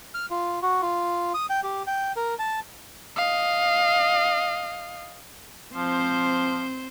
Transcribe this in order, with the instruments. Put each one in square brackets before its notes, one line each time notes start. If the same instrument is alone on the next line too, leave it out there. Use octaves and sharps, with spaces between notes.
[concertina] F6
F4
F#4
F4
D#6
G5
G4
G5
A#4
A5
[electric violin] D#5 F5
[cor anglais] F3 [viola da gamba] C4 C5